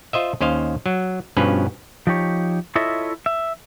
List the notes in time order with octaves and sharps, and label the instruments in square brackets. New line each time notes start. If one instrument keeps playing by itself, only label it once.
[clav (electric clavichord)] F4 C5 D#5 E5
D#2 C#4 C5 D#5 F5
F#3
G2 B2 F3 C#4 B4
[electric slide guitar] F3 D#4 G4 C#5
E4 F4 A4 C#5 D#5 E5
E5